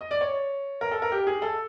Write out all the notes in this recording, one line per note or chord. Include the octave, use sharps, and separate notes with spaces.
D#5
D5
C#5
A#4
A4
A#4
G4
G#4
A4